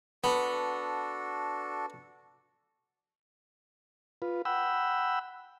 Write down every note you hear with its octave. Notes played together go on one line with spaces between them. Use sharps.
B3 D4 F#4 A4
F4 B4
F#5 G5 B5 E6